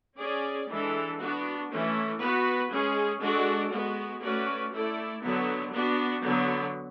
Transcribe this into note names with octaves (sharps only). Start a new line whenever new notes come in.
C#4 G#4 D5
E3 G#3 D4 A4
B3 D4 F#4
E3 A3 C#4
B3 F#4 B4
G#3 C#4 G#4
G#3 D4 F#4 A4 D5
G#3 B3 F#4
A3 C#4 F#4 B4 D5
A3 E4 A4 D5
D3 F#3 B3
B3 D4 F#4
D3 F#3 B3